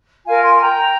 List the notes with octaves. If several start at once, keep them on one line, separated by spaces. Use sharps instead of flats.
F4 A#4 F5 G#5
G#5 C6
G5 A#5